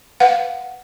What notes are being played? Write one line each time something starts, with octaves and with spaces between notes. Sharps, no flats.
B4 F5 F#5